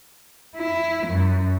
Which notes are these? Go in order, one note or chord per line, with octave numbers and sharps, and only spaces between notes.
E4
F#2